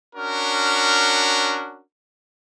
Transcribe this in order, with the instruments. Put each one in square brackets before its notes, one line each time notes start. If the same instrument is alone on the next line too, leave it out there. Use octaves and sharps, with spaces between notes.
[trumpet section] C#4 D4 F#4 A#4